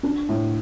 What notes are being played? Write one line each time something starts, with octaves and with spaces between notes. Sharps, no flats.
D4
A2